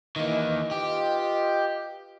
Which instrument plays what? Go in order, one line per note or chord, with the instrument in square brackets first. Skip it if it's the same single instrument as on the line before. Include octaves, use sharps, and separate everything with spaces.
[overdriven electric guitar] D#3 A#3 [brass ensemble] E3 D#5
[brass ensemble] F4 B4 D#5 [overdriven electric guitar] G4